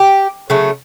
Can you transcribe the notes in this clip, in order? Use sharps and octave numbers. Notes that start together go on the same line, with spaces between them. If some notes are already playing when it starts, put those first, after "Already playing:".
Already playing: G4
C#3 F#3 A3